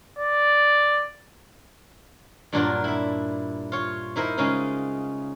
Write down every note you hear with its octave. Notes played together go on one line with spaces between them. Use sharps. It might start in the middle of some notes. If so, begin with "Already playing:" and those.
D5
G2 A#2 F#3 D4 F4 A#4
E4 E5
F4 C#5
D#4 E4 A#4 C5
C#3 G#3 C#4 D#4 F4